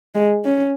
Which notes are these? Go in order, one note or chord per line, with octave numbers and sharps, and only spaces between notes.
G#3
C#4